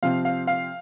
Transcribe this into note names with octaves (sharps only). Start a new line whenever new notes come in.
C3 F3 C4 F5
F5
F5